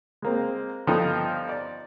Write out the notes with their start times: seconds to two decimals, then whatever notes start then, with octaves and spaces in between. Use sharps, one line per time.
0.22 G#3 A#3 C4
0.87 G2 D3 F3 B3 D#4
1.49 D5